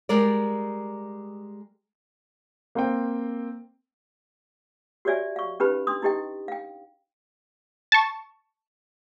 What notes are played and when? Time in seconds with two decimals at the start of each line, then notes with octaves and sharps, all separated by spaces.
0.09 G3 G#3 A#4 D5
2.75 A#3 C4 G5
5.05 F#4 G4 C#5 D5 E5 G#5
5.36 F5 C#6
5.60 C#4 D#4 G4 B4 B5
5.87 D4 C6 D#6
6.02 D#4 E4 G4 D#5 G5
6.48 F5 G5
7.92 A5 C#6